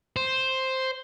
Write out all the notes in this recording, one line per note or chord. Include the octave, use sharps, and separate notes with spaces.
C5